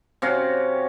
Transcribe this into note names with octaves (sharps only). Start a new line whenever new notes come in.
C3 C#4 F#4 F5